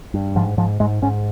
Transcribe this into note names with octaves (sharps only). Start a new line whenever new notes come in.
G2
G#2 F3
G#2 F3
G#2 G#3
G#2 C#4